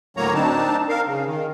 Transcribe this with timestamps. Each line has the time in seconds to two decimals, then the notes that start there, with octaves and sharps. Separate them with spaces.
0.17 D2 A2 F#3 A#3 C#5 A#5
0.34 C4 D4 D#4 A5
0.89 A#4 F5
1.07 C#3
1.27 D#3